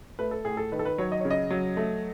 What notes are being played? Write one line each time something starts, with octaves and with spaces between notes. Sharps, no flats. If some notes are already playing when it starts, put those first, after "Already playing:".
A3 B4
A4
A2 G#4
A4
D#3 B4
A4
B4
F#3 C#5
D#5
C#3 C#5
D#5
F#3
A3